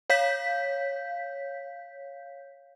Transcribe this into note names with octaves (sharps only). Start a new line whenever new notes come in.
C#5 F5 G6 B6